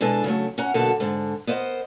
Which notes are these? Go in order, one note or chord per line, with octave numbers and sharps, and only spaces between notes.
B2 G#3 D4 E4 A4 G#5
C#3 F#3 A3
C#4 F#5 A#5
F#2 B2 D3 A#3 F#4 A4
G#2 D3
B3 A#4 C5 D5 D#5